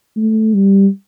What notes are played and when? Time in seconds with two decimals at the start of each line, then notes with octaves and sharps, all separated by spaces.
0.17 A3
0.54 G3